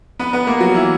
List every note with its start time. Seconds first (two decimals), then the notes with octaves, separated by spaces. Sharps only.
0.19 B3 B4
0.33 B3 B4
0.47 A#3 A#4
0.60 F#3 F#4
0.74 E3 E4